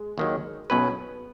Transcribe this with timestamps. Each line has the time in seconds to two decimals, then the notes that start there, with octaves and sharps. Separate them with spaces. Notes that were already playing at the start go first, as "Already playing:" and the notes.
Already playing: G#3
0.18 D#2 D#3 F#3
0.70 B1 B2 F#3 B3 C#4 B4